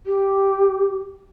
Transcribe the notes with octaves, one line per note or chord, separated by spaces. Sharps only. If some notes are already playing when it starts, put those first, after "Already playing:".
G4